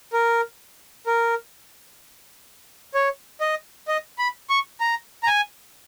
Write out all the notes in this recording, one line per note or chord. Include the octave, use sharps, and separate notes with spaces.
A#4
A#4
C#5
D#5
D#5
B5
C#6
A#5
A#5
G#5